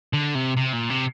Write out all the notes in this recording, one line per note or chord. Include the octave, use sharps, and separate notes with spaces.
D3
C3
C3
A#2
C3